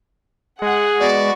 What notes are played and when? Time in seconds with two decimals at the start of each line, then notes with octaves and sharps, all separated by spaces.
0.62 G#3 G#4 F#5
1.00 B3 F#4 D5 C#6